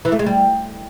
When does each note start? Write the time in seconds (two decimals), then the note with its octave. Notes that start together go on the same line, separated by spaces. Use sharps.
0.05 E3
0.12 A3
0.19 G#3
0.26 G3